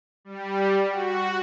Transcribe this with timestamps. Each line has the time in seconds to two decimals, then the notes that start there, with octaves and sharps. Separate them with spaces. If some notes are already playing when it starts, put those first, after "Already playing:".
0.25 G3
0.90 F#4